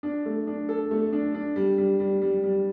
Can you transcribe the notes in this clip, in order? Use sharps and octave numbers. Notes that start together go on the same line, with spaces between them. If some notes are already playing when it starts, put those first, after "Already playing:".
D4
A3
D4
A4
A3
D4
D4
G3
G3
G3
G3
G3